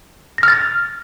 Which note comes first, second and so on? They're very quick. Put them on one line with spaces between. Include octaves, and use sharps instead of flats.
A#6 F6 A6